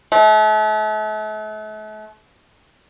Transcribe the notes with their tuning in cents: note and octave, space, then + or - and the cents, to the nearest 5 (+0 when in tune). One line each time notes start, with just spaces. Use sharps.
A3 -40